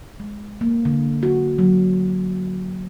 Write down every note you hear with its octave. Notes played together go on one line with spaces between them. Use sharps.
G#3
A#3
D3
F#4
F#3